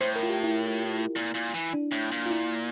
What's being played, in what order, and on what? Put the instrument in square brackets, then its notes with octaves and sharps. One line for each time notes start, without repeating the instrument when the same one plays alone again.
[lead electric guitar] A2 [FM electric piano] C5
[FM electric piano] A#4
F4
G4
E4
[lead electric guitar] A#2
A#2
E3
[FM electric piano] D4
[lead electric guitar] A2
A#2
[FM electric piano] F4
E4